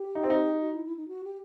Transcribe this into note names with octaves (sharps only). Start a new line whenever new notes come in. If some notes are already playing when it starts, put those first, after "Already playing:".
Already playing: G4
D#4
C4
D#4
F#4
E4
E4
D#4
F#4
G4